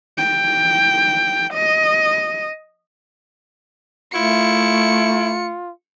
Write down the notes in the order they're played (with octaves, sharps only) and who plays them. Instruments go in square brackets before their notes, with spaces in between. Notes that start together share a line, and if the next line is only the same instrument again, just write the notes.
[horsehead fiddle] G5
D#5
[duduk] A3 [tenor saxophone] E4 [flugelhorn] F4 [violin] C#7